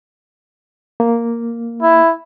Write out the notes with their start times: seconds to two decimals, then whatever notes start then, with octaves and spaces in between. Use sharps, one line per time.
1.00 A#3
1.82 E4